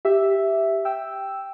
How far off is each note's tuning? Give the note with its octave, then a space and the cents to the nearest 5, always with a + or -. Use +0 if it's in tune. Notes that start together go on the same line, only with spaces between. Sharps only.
G4 +0 E5 +0
G5 +0 E6 +0